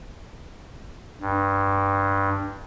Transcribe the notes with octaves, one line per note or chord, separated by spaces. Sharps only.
G2